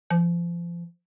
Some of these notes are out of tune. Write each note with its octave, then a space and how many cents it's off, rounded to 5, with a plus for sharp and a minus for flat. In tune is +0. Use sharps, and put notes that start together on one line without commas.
F3 -30